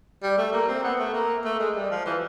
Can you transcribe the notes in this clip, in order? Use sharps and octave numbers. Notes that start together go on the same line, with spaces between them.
G3
A3
A#3
C4
B3
A3
A#3
A3
G#3
G3
F3
E3